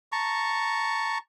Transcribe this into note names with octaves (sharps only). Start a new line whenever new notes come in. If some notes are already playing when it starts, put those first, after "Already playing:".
A5 A#5 C#6